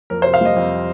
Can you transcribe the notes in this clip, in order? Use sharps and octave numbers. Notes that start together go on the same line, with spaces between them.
F2 A#4
C5
C3
F5
G3 D#5
F2